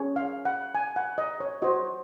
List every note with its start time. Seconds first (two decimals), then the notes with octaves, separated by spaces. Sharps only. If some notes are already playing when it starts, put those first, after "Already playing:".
Already playing: C#4 G#4 C#5
0.16 F5
0.45 F#5
0.75 G#5
0.96 F#5
1.18 D#5
1.40 C#5
1.62 F#4 C5 D#5